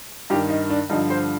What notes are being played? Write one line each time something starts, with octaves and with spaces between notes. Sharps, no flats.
G2 D#3 G4
D#4
D4
G2 D3 F3 D#4
C5